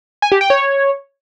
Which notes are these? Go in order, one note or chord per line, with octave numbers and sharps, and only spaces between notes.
G#5
G4
G5
C#5